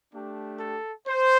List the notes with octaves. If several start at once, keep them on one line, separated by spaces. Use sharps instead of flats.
A3 D4 G4
A4
C5